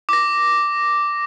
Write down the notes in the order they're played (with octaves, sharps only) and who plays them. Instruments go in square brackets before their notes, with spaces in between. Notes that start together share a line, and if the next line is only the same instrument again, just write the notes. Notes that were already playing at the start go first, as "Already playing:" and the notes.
[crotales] D6 A#6